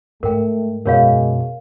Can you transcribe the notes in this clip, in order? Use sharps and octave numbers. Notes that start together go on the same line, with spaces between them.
G#2 A3 A#4 G5
F#2 B2 G#3 A#4 C#5 F5